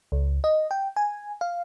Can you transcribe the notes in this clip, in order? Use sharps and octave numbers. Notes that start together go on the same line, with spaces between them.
C#2
D#5
G5
G#5
F5